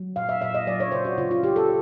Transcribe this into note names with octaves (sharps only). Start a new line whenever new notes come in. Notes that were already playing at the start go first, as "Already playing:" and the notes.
Already playing: F#3
A#2 F5
E5
A#2 E5
D#5
F#3 D5
C#5
C#3 C5
F#4
C#3 F4
F4
C#3 G4
A4